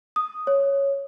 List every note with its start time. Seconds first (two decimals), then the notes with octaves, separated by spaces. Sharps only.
0.16 D#6
0.47 C#5